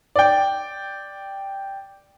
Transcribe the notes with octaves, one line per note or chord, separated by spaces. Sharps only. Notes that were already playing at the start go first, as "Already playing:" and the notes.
D5 G5